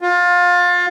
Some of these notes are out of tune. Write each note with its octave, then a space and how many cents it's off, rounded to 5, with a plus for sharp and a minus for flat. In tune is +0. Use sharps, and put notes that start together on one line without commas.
F4 +25